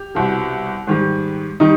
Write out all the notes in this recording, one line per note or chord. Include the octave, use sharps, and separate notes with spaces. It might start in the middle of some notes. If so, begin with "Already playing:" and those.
Already playing: G4
C2 B2 G3
G#2 D#3 G3
D#3 G3 D#4